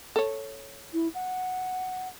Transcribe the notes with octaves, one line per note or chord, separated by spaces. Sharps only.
A4 C#5
E4
F#5